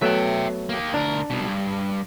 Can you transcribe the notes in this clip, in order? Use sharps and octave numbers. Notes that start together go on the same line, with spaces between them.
F#3 A3 B3 E5 G5
A#3 G4
D2 D4 A#4
C2 B2
G2